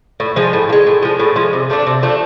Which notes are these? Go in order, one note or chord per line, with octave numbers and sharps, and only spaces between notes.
A2
F3 G#3
A2
F3
G#3
A2
F3 G#3
A2
F3 G#3
C3
F3 A3 D4
C3
F3 A3 D4